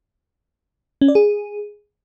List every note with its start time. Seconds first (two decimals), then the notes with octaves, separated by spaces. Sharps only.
1.01 C#4
1.08 D5
1.15 G#4